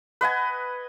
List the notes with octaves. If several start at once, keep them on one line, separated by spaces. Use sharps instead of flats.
B4 D#5 F#5 G#5